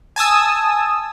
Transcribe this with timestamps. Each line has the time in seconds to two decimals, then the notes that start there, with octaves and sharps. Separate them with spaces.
0.16 G#5 A5 D#6 E6